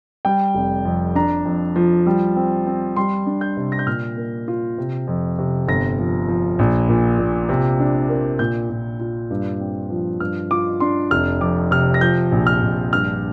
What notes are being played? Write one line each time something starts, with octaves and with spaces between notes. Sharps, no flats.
G3 G5
F1
F2
D4 A#5
F2
F3
G3
C4
C4
G3 C6
D4
G6
C3
A#6
G6
A#2 F6
A#3
F4
C3
F2
C3
G1 A#6
F3
F3
A#1
A#2
A#2
C3
D4
A#3
A#2 G6
A#2
F4
G2
C4
F3
G2 F6
F4 D6
D4 C6
F1 F6
F2 D6
C3 F6
A#6
F3 G6
A#1
F6
A#1
G2 F6